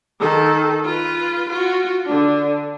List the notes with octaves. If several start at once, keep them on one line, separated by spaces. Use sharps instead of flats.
D#3 A4
F4 B4
F4 F#4
D3 D4